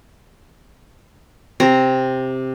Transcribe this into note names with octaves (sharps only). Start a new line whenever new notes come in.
C3 C4 A#5